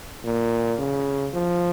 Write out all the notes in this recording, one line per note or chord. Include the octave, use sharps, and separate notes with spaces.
A#2
C#3
F3